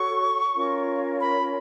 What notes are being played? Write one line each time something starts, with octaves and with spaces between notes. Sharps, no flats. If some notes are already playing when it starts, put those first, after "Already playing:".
Already playing: F#4 A4 C#5 C#6
C#4 F4 A#4 C#5
B5